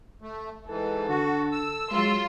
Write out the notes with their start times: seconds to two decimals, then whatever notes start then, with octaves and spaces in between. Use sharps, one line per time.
0.22 A3
0.67 G#2 E3 A4
1.08 D3 F#4
1.52 E6
1.91 F#3 G#3 F4 C6